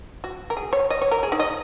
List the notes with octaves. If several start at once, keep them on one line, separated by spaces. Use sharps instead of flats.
F#4
A#4
G#4
C#5
D#5
C#5
A#4
G#4
D#4
D#5